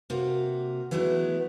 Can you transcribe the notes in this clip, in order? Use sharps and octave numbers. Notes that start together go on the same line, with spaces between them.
C3 A#3 F#4
E3 F#3 G#3 A3 B3 E4